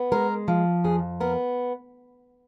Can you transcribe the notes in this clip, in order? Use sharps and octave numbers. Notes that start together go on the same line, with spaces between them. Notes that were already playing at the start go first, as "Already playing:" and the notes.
Already playing: B3
G#3 A#4
F3
F2 G#4
B3 A#4